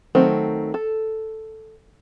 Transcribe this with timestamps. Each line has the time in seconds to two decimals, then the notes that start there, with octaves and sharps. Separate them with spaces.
0.15 D#3 F#3 A3 C4
0.74 A4